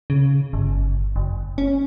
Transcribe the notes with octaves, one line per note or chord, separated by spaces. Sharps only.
C#3
G1
F#1
C#4